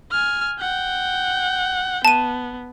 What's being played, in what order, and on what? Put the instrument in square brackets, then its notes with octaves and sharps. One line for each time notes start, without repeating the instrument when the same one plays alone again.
[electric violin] G#5 F6
F#5 G5
[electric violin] B3 [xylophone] A5 D#7